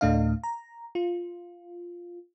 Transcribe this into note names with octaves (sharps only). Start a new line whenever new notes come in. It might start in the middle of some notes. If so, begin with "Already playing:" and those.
D2 A2 A3 D4 D#5 F5
A#5
F4